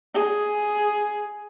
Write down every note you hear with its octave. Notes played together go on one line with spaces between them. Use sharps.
G#4